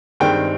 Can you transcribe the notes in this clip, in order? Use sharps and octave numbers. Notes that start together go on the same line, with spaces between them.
G2 D#3 G#3 C4 G5